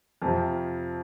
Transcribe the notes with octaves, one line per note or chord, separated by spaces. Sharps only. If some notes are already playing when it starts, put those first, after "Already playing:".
F2 C3 F3